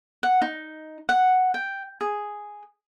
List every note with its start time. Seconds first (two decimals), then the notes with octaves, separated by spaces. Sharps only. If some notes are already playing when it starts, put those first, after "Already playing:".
0.23 F#5
0.42 D#4
1.09 F#5
1.54 G5
2.01 G#4